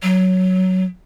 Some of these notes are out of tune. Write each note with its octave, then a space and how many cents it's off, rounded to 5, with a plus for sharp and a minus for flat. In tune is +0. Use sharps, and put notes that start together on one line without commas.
F#3 +5